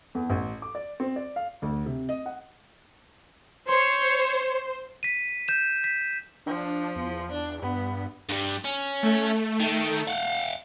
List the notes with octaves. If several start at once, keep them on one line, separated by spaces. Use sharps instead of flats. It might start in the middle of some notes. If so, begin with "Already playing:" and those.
E2
A1
D6
D5
C4
D5
F5
D2
C3
D#5
F#5
C5 C#5 C6
B6 D#7
G6 E7
B6
F3 D4
E2
D4
G2 B3
G2 G3
C#4
A3
D#3
F5 F#5